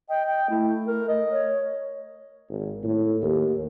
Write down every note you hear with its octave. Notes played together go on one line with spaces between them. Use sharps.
D#5 G5
G5
A3 E4
A#4
D#5
C#5
G#1
A2
D#2